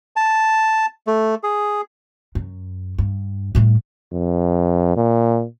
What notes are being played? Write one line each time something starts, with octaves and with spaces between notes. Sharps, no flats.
A5
A3
G#4
F#2
G2
A2 G3
F2
A#2